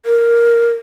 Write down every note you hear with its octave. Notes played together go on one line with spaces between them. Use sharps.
A#4